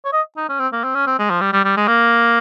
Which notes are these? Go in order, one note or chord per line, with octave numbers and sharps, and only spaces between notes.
C#5
D#5
D#4
C#4
C4
A#3
C4
C#4
C4
G#3
F3
G3
G3
G3
G#3
A#3